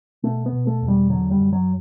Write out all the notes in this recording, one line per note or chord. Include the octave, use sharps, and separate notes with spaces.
B2 A3
B3
B2
A3
E2
G3
D3 F#3
G3
F#2
F#3